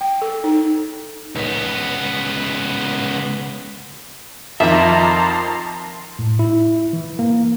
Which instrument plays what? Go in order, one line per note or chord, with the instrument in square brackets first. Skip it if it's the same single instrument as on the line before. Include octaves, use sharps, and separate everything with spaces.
[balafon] G5
A4
D#4
[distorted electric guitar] C#2 B3
[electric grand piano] F2 D#3 F3 [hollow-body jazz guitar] E5 [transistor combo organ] A5 [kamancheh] A#5 C6
[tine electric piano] A2
E4
E3
A#3